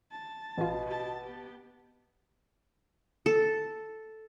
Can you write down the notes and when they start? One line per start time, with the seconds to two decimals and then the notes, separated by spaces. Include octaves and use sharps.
0.12 A5
0.57 A1 B2 F4
0.86 G4 A5
1.23 B3 G4
3.26 A4